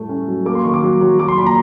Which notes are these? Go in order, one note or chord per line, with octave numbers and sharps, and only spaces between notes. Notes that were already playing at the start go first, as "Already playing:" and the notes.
Already playing: A2 G3 A3
C#4
F#3
A#3 D6
C6
D#3 C#6
D6
F#3
F#3
F#3 D6
C6
A#2 B5
A#5